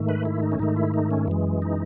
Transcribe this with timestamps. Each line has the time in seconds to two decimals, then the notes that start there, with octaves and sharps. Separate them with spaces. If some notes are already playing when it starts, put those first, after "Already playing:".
Already playing: G#2 D#3 A3
0.09 B4
0.25 E4
0.43 D#4
0.52 C#4
0.59 G#2 D#3 A3 D#4
0.76 E4
0.94 D#4
1.11 C#4
1.28 F#2 E3 G#3
1.62 D#4